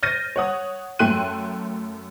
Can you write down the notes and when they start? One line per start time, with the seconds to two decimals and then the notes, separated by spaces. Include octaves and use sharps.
0.03 F6 G6 A6 A#6 D#7
0.36 C#5 F#5 D#6
0.99 F#2 A3 G5 C6 F#6 D#7